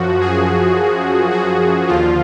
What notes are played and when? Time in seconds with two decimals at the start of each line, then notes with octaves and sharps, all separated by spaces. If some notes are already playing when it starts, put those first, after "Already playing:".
Already playing: F#2 F3 F#4
0.21 G#4
1.31 F#4
1.87 D#2 D3 F3 F4